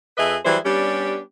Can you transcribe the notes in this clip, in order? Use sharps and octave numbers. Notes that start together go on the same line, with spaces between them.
F2 G#4 B4 D#5 E5
E3 F#3 G3 G#4 C5 E5
G3 B3 C#4 D4 G4